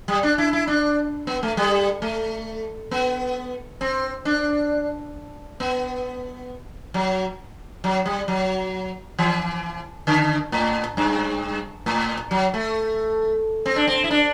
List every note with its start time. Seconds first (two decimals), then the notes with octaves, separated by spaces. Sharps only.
0.08 G3
0.23 D4
0.38 E4
0.53 E4
0.68 D4
1.27 B3
1.43 A3
1.57 G3
2.02 A3
2.91 B3
3.81 C4
4.25 D4
5.60 B3
6.94 F#3
7.84 F#3
8.06 G3
8.28 F#3
9.19 E3
10.07 D3
10.52 A2
10.97 G2
11.86 A2
12.31 F#3
12.54 A3
13.66 C4
13.76 D4
13.87 C4
14.04 E4
14.11 D4